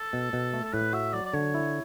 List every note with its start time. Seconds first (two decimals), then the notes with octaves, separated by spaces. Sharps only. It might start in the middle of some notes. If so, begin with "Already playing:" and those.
Already playing: A4
0.13 B2
0.33 B2
0.53 A3
0.65 A4
0.73 A2 B4
0.93 F#4 E5
1.13 F#3 D5
1.26 D5
1.34 D3 C#5
1.54 E4